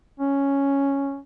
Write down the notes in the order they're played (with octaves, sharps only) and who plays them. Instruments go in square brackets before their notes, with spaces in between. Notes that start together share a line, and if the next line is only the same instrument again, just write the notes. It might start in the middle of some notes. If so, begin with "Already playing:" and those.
[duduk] C#4